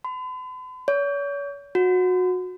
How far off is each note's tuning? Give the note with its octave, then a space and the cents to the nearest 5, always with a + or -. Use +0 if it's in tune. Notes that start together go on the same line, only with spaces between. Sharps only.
B5 +45
C#5 +40
F#4 -20